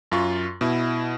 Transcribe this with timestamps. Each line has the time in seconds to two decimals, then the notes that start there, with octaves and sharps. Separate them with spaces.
0.12 F#2 F4 C#6
0.61 B2 E4